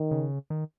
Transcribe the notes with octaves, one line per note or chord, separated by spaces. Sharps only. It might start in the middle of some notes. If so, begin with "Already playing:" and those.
Already playing: D#3
C#3
D#3